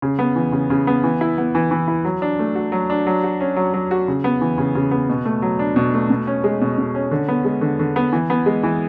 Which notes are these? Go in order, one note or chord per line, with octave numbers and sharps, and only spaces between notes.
C#3
B3
E3
C#3
C#3
B3
E3
E4
B3
E3
E3
E4
F#3
D4
A3
F#4
F#3
D4
F#3
F#4
C#4
F#3
F#3
F#4
C#3
B3
E3
C#3
C#3
B3
B2
A3
F#3
D4
B2
A3
B2
C#4
G#3
B2
B2
C#4
D3
B3
G#3
D3
D3
B3
E3
B3
G#3
E3